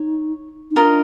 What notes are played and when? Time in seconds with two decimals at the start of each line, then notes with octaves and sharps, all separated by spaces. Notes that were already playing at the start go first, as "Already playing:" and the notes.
Already playing: D#4 C#5
0.71 D#4
0.76 D4 F4 A#4 D#5